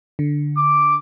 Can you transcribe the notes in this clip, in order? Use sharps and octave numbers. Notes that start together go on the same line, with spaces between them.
D3
D6